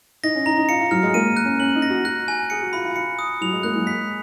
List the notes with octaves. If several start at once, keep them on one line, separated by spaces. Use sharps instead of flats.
D#4 A#6
C#4
D#4 A#5
D#4
F4 C#7
F4
F#3 F6
G#3
A#3 D#7
F#6
C#4
C#4 F#7
D#4
A#6
F#4
F#4 F#6
G#5
G#4 C#7
F#4
F4 B5
F4
F4 C#7
D#6
F#3 F7
G#3
A#3 F#6
F#3
G#3 B6